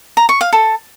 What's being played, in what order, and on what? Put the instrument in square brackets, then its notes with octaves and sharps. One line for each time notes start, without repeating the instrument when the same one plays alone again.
[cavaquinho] A#5
C#6
F5
A4